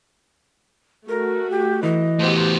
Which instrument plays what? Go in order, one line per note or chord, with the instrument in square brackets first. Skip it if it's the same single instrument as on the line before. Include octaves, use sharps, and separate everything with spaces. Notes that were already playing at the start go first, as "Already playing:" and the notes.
[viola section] A3 F#4 [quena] A#4
[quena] G4
[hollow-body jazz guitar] E3 [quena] D#5
[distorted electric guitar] A2 B3 [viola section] F#4 G4 C5